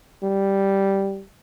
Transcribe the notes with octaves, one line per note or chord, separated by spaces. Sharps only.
G3